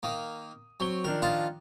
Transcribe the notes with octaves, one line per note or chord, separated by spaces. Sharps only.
D#3 A#3 D#6
F#3 C4 C#6 G7
D#3 F3 D4 A#4
F4 D#5 A5